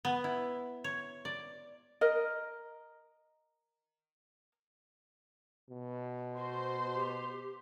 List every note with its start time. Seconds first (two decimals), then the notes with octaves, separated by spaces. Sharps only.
0.05 B3
0.24 E4
0.84 C#5
1.25 D5
2.01 A#4 D#5
5.69 B2
6.37 F#4 C5 C6
6.94 G4